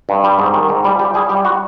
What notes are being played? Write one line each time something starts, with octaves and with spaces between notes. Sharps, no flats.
G2
G3
G#2
D#3
G#2
G3
G3 G4
G3 G#4
G3 G4
F#4